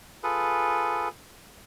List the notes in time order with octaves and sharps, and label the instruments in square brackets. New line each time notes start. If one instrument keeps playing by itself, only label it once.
[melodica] F4 G#4 A4 B4